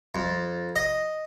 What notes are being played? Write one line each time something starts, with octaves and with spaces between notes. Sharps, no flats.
F2
D#5